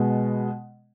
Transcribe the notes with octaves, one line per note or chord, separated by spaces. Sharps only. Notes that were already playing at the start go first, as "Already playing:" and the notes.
Already playing: B2 G#3 B3